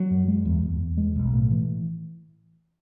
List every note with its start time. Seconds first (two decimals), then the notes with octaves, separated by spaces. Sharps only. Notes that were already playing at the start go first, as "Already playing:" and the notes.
Already playing: F#3
0.11 F#2
0.28 G#3
0.45 E2
0.62 E2
0.80 E2
0.97 G#3
1.16 B1
1.33 A2
1.51 E3